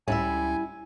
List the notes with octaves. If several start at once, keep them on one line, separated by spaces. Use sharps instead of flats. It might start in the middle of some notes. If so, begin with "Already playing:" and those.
C#2 A2 G3 C#4 E4 E5 G#5